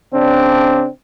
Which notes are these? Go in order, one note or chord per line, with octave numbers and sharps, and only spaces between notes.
C#3 C4 D4